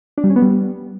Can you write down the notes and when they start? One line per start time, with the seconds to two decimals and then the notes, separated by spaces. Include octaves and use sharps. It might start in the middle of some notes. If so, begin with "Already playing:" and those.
0.18 D4
0.24 G3
0.30 C#4
0.36 B3
0.42 G3